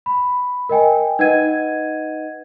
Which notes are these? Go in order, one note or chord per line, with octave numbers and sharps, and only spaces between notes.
B5
A#4 D#5 G5 G#5
D#4 B4 D#5 F#5 G#6 D#7